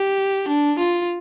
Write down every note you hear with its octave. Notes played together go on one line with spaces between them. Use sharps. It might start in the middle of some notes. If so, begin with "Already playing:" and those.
Already playing: G4
D4
F4